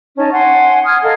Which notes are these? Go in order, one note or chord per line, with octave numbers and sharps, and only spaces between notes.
C#4 D#4 A5
F#5 G#5 C6
D#6 F6 G#6
A4 A#4 D#5 F5